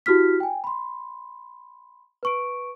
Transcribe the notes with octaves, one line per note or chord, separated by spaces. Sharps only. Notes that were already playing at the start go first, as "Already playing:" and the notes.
E4 F#4 G4 F6 B6
G5 G#5
B5 C6
B4 C#6 D7